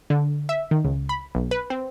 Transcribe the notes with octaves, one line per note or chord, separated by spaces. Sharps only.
D3
E5
D#3
C#2
B5
B1
B4
C4